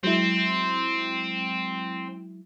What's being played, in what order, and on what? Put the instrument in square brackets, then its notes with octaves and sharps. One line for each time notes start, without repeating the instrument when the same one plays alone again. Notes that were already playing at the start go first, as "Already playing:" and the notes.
[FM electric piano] F#3 G#3 E4 [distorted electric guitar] C4